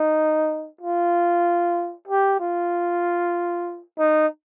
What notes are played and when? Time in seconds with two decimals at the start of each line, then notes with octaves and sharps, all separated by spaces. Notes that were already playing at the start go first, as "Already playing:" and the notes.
Already playing: D#4
0.81 F4
2.08 G4
2.40 F4
3.99 D#4